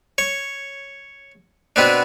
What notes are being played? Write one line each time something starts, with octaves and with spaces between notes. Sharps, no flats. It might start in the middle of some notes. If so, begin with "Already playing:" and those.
C#5
B2 B3 C4 D4